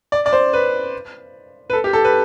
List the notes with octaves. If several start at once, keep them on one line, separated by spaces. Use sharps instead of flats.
D5
D5
C5
B4
B4
A4
G4
A4
B4